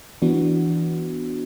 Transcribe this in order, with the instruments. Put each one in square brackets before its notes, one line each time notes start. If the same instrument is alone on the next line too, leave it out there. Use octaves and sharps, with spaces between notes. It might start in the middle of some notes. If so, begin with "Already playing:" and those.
[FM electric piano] E3 B3 D4 F#4